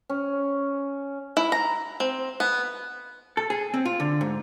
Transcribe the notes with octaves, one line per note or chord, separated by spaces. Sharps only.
C#4
E4
A#5
C4
B3
A4
G#4
C4
F4
D3
G#2